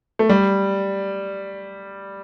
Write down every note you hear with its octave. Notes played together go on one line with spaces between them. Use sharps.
A3
G3